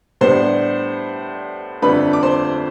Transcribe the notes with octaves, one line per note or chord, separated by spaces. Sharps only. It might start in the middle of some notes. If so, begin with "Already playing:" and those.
A2 G3 B3 D4 C5 C6
G1 F2 D3 A3 D4 B4 B5
D6
C5 C6